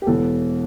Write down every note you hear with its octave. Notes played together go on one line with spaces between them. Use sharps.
G4
E1 E2 E3 A4